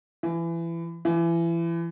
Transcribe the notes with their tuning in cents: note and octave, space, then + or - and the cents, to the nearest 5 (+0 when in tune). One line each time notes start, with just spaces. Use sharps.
E3 +25
E3 +30